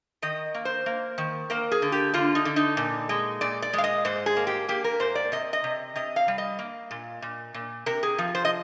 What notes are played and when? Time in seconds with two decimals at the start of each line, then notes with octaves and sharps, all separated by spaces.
0.22 D#3 D#5
0.54 A#3
0.65 C5
0.86 A#3
1.18 D#3
1.50 A#3 A#4
1.72 G#4
1.82 D3
1.92 G4
2.14 D3 F4
2.35 D#4
2.45 D3
2.56 D#4
2.77 A#2
3.09 G#3
3.41 A#2 D5
3.62 D5
3.73 G#3
3.78 F5
3.84 D#5
4.05 G#2 C5
4.26 G#4
4.36 A#3
4.47 G4
4.68 A#3 G4
4.84 A#4
5.00 G#2 C5
5.15 D5
5.32 C3 D#5
5.53 D#5
5.64 C3
5.96 C3 D#5
6.16 F5
6.28 G3
6.38 D#5
6.59 A#3
6.91 A#2
7.22 A#2
7.54 A#2
7.86 C3 A#4
8.03 G#4
8.18 F3
8.35 C5
8.45 D#5